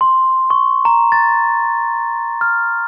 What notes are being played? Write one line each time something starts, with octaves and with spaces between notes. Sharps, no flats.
C6
C#6
A#5
A6
F6